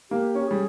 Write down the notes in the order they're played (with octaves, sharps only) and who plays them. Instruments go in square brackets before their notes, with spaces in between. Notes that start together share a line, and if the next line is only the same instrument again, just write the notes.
[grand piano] A#3 [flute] G4
[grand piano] C#4 [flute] G4
[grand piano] G3 [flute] G#4